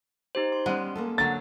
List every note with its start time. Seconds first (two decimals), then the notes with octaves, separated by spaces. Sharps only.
0.35 D#4 G4 C5
0.52 C6
0.66 G3 G#3 B3 C#4
0.96 A#3 C#4 A4
1.18 D3 F#3 A6